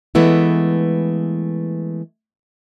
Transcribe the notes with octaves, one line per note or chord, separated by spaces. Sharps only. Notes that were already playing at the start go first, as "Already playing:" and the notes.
E3 G#3 A3 B3 E4